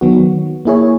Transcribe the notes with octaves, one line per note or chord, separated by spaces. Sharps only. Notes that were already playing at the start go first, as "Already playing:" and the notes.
D#3 F#3 B3 F#4
A#3 E4 G#4 C#5